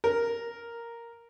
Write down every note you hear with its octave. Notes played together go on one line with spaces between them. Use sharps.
A#4